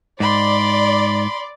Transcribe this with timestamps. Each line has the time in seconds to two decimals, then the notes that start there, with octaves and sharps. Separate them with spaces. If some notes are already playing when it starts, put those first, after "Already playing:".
0.20 G#2 D5 B5 C6